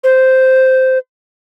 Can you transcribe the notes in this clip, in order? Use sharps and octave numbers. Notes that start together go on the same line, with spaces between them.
C5